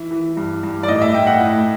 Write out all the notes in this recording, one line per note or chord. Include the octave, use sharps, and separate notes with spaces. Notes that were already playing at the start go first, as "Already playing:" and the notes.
Already playing: E3 E5
E3
G2
G2
D5
A2 D#5
E5
A2 G5
F#5
A2